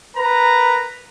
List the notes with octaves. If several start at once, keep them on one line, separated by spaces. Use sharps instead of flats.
A#4 B4 A#5